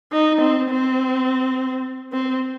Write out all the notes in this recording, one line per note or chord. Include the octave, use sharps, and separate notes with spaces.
D#4
C4
C4
C4